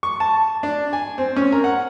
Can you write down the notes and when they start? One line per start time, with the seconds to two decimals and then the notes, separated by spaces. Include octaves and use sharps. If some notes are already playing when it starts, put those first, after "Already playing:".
0.03 C#6
0.20 A5
0.63 D4
0.93 G#5
1.18 C4
1.36 C#4
1.52 A#4
1.64 F#5